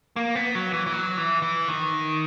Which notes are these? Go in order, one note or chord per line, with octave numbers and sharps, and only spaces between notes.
A#3
B3
F#3
E3
E3
F#3
E3
E3
D#3